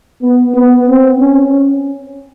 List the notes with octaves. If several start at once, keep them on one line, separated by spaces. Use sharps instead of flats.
B3
B3
C4
C#4